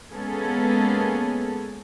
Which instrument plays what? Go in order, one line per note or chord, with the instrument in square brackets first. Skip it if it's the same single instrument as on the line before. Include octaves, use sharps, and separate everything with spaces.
[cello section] G#3 A#3 B3 C#4 G#4 A4